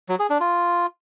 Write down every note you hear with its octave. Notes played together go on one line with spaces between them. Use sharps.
F#3
G#4
D4
F4